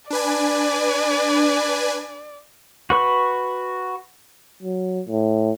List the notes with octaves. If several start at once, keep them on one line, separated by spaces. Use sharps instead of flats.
D4 B4 D5 G#5
F#4 B4 C#6
F#3
A2